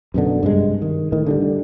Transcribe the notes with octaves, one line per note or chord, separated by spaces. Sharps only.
F#2 B2 D3
G2 C3 G#3
D#3
A2 D#3
D3 F#3 G3